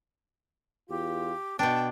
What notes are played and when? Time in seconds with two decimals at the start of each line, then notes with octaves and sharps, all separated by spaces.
0.89 E2 F4 G4
1.59 B2 B3 D4 G5 A5